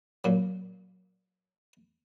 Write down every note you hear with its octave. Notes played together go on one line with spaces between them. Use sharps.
A#2 F#3